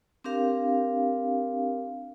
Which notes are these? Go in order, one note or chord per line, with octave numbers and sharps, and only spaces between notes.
C4 D4 G4 A#4 F5